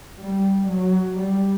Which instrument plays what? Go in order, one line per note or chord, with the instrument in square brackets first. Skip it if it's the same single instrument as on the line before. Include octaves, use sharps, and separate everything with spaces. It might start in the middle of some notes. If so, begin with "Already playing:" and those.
[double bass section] G3
F#3
G3